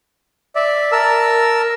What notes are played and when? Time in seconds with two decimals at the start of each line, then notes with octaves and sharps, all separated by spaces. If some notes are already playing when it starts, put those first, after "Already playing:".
0.56 D5 E5
0.92 A#4 A5 E6